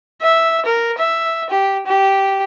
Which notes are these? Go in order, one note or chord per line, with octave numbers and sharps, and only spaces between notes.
E5
A#4
E5
G4
G4